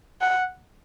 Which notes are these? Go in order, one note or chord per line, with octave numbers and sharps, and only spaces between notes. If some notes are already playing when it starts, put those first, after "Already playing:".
F#5